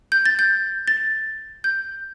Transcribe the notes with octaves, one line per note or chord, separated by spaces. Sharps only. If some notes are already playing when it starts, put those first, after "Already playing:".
G6
A6
G6
A6
G6